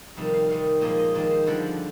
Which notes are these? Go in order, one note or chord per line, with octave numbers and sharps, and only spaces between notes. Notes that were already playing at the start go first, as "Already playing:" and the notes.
F2 C3 D#3 G3
F5
C3 D#3 G3 F5
A#2 F3 G#3 D#5
D#5
F2 D#3 G#3 D5
C5
G2 D3 F3 D5